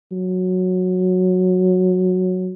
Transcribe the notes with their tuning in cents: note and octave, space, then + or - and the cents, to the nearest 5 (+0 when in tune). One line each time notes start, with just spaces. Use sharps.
F#3 -10